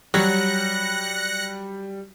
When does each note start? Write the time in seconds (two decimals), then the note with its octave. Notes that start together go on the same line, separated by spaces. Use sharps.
0.14 F#3 G3 F#6 A#6 C#7